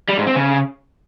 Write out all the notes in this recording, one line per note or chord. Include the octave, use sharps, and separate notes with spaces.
G3
G#2
C4
C#3